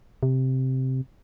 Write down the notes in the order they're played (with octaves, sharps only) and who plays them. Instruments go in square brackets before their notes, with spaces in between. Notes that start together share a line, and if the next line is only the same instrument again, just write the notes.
[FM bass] C3